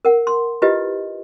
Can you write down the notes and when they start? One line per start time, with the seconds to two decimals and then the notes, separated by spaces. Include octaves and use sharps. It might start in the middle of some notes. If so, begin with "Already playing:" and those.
0.05 A#4 F#5
0.27 C6
0.62 E4 F4 G4 B4 D#5